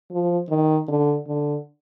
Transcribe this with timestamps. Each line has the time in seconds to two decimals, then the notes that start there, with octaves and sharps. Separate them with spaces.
0.11 F3
0.50 D#3
0.88 D3
1.27 D3